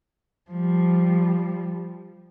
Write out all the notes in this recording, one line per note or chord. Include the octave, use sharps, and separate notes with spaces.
F3 G3